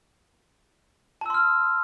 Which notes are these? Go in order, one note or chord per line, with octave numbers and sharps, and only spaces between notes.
A5 C6 E6 F6